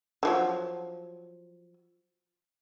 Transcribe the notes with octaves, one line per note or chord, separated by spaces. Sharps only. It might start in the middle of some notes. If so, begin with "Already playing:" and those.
D3 F3 F#3